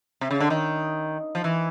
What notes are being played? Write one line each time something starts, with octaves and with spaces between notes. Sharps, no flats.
C3
C#3
D3
D#3
F3
E3